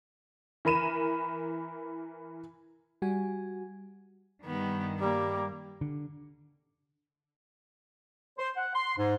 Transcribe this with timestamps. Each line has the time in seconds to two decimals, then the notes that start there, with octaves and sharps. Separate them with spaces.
0.65 E3 A#4 B5 D#7 E7
3.02 G3 F#4 G#5
4.45 G2 D#3 B3
5.01 G3 A#3
5.81 D3
8.38 C5
8.56 F#5
8.74 C6
8.98 G#2